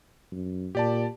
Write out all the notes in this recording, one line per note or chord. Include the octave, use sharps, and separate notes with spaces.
F#2
A#2 G4 D5 A5